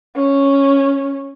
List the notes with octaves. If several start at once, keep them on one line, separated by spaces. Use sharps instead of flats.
C#4